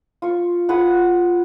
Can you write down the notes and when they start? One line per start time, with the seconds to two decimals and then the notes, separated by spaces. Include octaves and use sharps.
0.22 F4 C#6
0.69 F4 G#4 B4 F#5